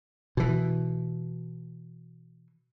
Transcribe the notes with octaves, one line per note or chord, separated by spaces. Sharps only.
B2 E3